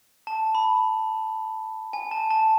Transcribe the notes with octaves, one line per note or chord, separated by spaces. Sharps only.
A5
B5
G#5
A5
A5